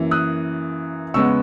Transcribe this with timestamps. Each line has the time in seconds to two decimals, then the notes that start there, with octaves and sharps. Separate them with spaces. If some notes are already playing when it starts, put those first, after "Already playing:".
Already playing: F#2 E3 A#3
0.11 D#6 F#6
1.14 E2 C#3 G#3 B3 C#6 E6